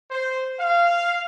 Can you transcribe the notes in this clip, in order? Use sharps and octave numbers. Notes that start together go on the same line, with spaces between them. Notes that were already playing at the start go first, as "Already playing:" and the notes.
C5
F5